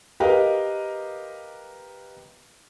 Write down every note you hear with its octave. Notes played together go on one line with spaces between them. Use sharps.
G4 A#4 B4 D#5 F5